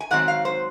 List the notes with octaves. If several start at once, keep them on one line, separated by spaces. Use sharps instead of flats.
G#5
G#2 D#3 F#3 C4 F#5
F5
C5